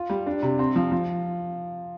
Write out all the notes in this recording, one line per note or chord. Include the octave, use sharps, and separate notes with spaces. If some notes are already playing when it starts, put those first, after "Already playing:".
Already playing: F4
G3
D4
C3
C4
F3
F3